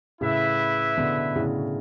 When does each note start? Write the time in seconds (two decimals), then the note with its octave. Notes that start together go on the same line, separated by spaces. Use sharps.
0.21 A2 C#3 E4 B4 E5
0.97 B2 D3
1.35 A2 C#3